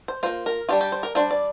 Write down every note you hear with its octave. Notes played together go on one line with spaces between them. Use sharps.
C5
A#3 F4 C5
A#4
G3 D4 F4 G4
G4
C5
A#4
G3 D4 F4 C5
D5